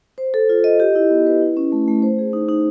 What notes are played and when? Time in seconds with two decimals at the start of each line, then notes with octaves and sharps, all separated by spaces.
0.18 C5
0.34 A4
0.49 F4
0.64 D#5
0.80 G4
0.95 E4
1.10 B3
1.26 B4
1.41 E4
1.57 C#4
1.72 A3
1.88 A3
2.02 C5
2.18 G#4
2.33 D#4
2.49 D#4